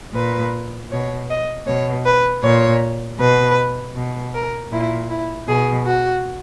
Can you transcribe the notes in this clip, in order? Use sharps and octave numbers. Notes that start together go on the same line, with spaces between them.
A#2 B4
B2 C#5
D#5
B2 C#5
B4
A#2 C#5
B2 B4
B2
A#4
A#2 E4
E4
B2 G#4
F#4